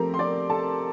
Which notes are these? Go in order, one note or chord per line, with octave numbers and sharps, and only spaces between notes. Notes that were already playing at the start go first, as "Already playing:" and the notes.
Already playing: F3 A3 C4 G4 A#4 A#5
C6
D5 D6
A4 A5